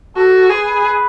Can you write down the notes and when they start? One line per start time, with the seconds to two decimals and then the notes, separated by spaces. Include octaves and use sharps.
0.16 F#4 A4
0.50 G#4 B4